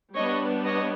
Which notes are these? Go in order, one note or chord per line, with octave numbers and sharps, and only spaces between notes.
G3 B3 D4 C#5 D#5
C#5 D#5